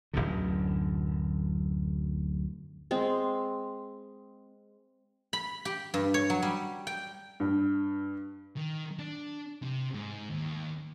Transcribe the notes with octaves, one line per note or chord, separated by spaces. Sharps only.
D1 G#1 F#2 D3
G#3 C4
B5
G4
G2
C#5
F#3
G3
G5
G2
D#3
D4
C3
G#2
D#2